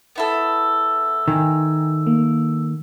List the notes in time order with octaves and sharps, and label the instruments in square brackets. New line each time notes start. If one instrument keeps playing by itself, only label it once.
[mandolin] B3 E4 A4
[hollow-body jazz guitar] D#3 [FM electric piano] G5 G#5 A#5
[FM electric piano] A#3